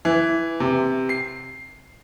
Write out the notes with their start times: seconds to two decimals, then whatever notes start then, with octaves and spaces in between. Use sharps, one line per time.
0.05 E3
0.60 C3
1.09 C7